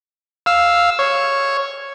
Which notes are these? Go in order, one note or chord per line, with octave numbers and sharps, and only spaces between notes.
F5 E6
C#5